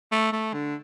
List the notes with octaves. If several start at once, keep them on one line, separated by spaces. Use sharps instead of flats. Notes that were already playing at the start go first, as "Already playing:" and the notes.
A3
A3
D3